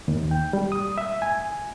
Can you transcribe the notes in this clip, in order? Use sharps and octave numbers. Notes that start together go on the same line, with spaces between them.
D#2
G5
G3
D#6
E5
G#5